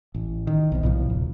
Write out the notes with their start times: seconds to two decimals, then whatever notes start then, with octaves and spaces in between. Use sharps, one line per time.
0.14 A1
0.47 D#3
0.72 B1 C3
0.83 B1 A2 C3 F3
1.10 D#1